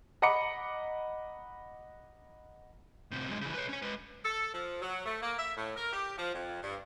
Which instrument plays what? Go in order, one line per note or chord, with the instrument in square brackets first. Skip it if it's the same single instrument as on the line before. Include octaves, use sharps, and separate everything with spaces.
[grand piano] D#5 F#5 A#5 B5 D6 C#7
[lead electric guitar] A2 C3
F#2 G#3
C#3 E3
B4 C#5
C#4 C#5
G#3 B4
[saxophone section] A4
F3
F#3
A3
A#3
E5
A2
A#4
G4
F3
F2
G2